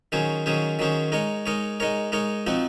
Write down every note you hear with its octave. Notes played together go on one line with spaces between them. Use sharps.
D#3 F#3 C#4 G#4 C5
D#3 F#3 C#4 G#4 C5
D#3 F#3 C#4 G#4 C5
G#3 D#4 A#4 C#5
G#3 D#4 A#4 C#5
G#3 D#4 A#4 C#5
G#3 D#4 A#4 C#5
F3 C4 D#4 F#4